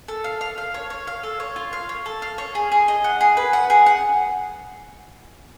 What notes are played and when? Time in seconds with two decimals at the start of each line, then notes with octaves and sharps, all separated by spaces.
0.08 A4
0.24 F5
0.41 F5
0.58 F5
0.74 C#5
0.90 C#5
1.07 F5
1.23 A4
1.40 C#5
1.56 F4
1.73 F5
1.89 C#5
2.06 A4
2.22 F5
2.38 C#5
2.55 G#4
2.72 G#4
2.88 D#5
3.04 F#5
3.21 G#4
3.37 B4
3.53 F#5
3.70 G#4
3.86 F#5